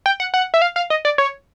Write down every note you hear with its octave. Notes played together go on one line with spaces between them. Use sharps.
G5
F#5
F#5
E5
F5
F5
D#5
D5
C#5